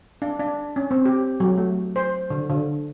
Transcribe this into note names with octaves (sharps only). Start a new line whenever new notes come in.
D4
D4
C#4
C4
G4
F#3
A3
C5
D3
D3